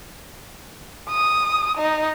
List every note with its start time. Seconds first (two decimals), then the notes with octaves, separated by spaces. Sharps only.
1.09 D#6
1.78 D#4